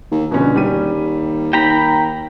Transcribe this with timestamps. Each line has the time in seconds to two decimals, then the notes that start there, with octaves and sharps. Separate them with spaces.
0.11 D#2
0.31 A#1 B2 D3 C#4
0.56 D#2 G3 D#7
1.53 D#2 G5 A#5 B5